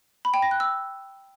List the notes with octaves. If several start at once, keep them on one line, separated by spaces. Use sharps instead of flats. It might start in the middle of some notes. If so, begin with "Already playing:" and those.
B5
G5
A#6
F#6
E6